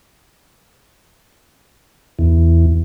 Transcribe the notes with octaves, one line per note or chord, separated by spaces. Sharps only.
E2